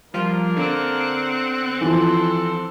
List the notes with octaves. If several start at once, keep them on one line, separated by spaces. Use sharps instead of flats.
F3 G3 A#3 D4 F4 A#4
D3 C4 F#5
E3 F3 A4 C6